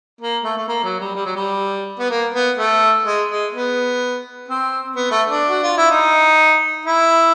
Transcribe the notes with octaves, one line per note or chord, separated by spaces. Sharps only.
A#3
A3
A3
A#3
F#3
G3
G3
F#3
G3
B3
A#3
B3
A3
G#3
G#3
B3
C4
B3
A3
D4
F#4
F4
E4
D#4
E4